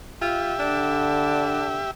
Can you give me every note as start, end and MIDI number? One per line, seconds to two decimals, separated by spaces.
0.22 0.54 65
0.22 1.91 67
0.22 1.91 76
0.60 1.84 50
0.60 1.79 62